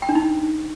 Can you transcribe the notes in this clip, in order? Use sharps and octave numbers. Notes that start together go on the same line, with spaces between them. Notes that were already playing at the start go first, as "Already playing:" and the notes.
G5
D4
D#4